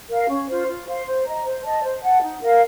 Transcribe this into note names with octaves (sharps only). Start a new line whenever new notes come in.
A#4 F5
C#4
F4 C5
F4
C5 F5 C6
C5
D#5 A#5
C5
D#5 A5
C5
F#5 A5
D#4
A#4 F5